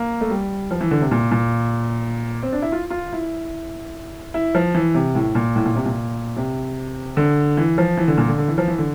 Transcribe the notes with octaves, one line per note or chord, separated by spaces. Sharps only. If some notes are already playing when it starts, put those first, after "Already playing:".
Already playing: A#3
A3
G3
F3
E3
D3
C3
A#2
A#2
C4
D4
E4
F4
F4
E4
E4
F3
E3
C3
A2
A#2
A2
A#2
C3
A#2
C3
D3
E3
F3
E3
D3
A#2
D3
D3
E3
F3
E3
D3